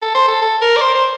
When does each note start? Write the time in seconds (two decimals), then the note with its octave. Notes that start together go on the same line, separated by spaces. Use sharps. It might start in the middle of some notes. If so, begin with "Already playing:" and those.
0.02 A4
0.15 C5
0.28 A4
0.42 A4
0.61 A#4
0.77 D5
0.81 C5
0.95 C5